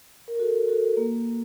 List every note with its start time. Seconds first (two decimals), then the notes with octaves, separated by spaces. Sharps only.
0.28 A#4
0.39 F#4 A4
0.68 F#4 A4
0.97 A#3